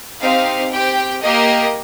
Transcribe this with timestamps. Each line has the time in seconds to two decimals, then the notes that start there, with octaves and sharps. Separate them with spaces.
0.21 C4 D#4 G4 F5
0.72 C4 G4 G5
1.22 A#3 G4 D#5